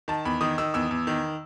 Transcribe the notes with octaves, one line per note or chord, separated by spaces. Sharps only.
D#3 A5
E2 B5
D#3 D#6
D#3 E6
E2 E6
E2
D#3